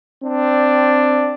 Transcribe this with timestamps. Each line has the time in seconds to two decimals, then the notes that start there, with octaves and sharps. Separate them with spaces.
0.24 C4 D4